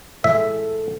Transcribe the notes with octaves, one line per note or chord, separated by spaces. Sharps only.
A2 E3 G#3 A4 E5